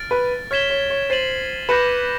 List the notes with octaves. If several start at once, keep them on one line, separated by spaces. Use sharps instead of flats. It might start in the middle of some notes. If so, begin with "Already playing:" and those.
Already playing: F6 A6 D7
B4
C#5 F6 G#6 B6 E7 G7
C#5
C#5
C5 A6 C7 D#7 F#7
B4 D6 G6 A#6 C#7 E7